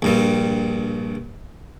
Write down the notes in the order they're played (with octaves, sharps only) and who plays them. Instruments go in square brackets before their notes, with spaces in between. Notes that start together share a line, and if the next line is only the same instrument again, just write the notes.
[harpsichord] A#1 G2 G3